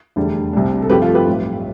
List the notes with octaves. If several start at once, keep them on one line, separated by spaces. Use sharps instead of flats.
F1 E2 D3 G3 D4
C2 C3 G3 D4
A4
G1 G2 F3 A3 C4 G4 B4
F4 A4
G4 B4
B1 A2 G3